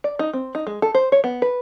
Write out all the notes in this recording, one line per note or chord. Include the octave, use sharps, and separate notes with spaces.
D5
D#4
C4
D#4
G#3
A4
C5
C#5
B3
B4